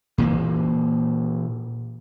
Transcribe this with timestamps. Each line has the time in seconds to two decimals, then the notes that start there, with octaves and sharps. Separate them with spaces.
0.18 A#2 E3 A#3